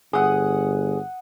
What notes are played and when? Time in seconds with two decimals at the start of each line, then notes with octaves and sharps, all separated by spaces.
0.13 G1 G#4 F#5 D#6